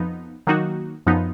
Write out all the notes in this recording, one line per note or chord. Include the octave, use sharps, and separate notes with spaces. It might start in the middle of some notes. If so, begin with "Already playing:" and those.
Already playing: F2 F3 B3 D#4
D#3 F#3 A#3 D#4 F#4
F#2 F3 B3 D#4